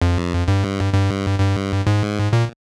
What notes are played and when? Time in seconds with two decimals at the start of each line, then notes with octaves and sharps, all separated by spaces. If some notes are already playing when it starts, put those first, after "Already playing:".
0.02 F2
0.48 G2
0.94 G2
1.40 G2
1.87 G#2
2.33 A#2